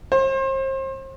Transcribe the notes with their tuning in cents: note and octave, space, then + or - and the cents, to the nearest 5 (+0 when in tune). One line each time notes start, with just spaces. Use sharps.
C5 +35